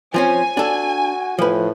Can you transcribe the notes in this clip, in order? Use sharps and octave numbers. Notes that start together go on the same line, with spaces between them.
F3 C4 C#4 G#5
D4 F#4 A4
A2 F3 B4